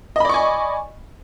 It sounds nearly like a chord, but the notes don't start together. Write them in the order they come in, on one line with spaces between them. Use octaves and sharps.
D#5 B5 D5 C#6 G#5